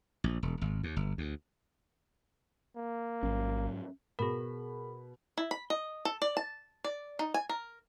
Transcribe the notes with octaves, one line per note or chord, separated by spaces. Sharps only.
A#1
E1
G#1
D#2
G1
D2
A#3
A1 G#2 F#3 C#4
B2 G#4 A#4 B5
E4
B5
D#5
A4
D5
A5
D5
D#4
G#5
A#4